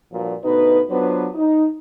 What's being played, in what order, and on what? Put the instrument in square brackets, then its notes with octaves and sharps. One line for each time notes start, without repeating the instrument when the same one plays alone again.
[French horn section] G2 A#2 F3 F#3
D2 B2 D#4 B4
F#3 B3 D4 F4 B4 C5
D#4